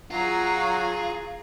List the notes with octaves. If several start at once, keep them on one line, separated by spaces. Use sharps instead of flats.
F#3 F4 G#4 A#5